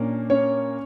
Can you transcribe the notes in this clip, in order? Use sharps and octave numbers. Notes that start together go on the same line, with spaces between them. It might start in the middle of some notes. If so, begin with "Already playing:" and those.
Already playing: A#2 A#3 C#4 D4
C#4 C#5